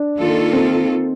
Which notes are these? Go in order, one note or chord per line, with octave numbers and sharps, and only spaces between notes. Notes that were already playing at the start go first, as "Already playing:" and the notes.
Already playing: D4
D#3 A#3 F4 A4
C4